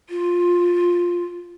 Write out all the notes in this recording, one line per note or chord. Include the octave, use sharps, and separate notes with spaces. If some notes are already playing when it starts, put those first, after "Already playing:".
F4